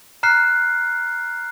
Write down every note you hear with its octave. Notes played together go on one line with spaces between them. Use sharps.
A#5 F6 F#6 C7